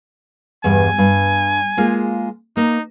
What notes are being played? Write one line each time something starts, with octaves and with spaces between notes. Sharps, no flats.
E2 G2 G#5
G2
G#3 A#3 F4
A#3 D#4